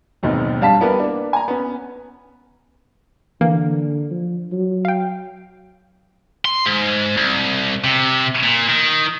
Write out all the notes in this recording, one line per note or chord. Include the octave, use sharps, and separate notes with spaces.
F#1 D#2 G#2 B2 C4 D#4
G2 G3 F5 A5 B6
G3 B3 E4 G4 A#4 B4
A#3 D4
G#5 A#5
B3 C#4
D3 E3 A#3
F3
F#3
F5 G5
C6
G#2
C2
C3
A#2
D#3